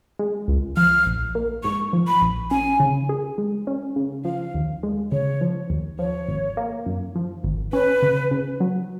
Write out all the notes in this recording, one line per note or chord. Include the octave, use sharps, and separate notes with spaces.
G#3
C#2
F3 F6
A#1
A#3
G#2 C#6
F3
B5
A#1
C#4 G#5
C#3
G#4
G#3
C#4
C#3
F3 F5
D#2
G#3
C#3 C#5
F3
D#2
F3 C#5
G#1
A#3
F#2
F3
G#1
C#4 B4
C#3
C#3
F#3